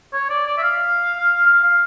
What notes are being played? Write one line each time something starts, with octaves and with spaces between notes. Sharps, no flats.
C#5
D5
D5
E5
F5
F5
F5